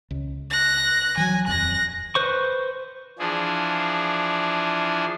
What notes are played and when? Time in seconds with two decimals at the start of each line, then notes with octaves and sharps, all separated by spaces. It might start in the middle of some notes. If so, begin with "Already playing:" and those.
0.11 C#2
0.50 F#6 A#6
1.17 E3 F#3 G#5
1.47 D#1 F2 F#6 A#6
2.15 B4 C5 C#6
3.19 E3 F3 D4 G#4